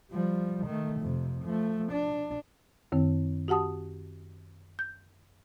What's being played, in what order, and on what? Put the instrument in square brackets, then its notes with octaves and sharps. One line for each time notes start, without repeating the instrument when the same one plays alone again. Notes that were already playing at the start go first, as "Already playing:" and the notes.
[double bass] F3 G3
D#3 A3
F2 C3
F3 A3
D4
[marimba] F#2 D#3 C4
F#4 G4 F#5 A5 D#6
G6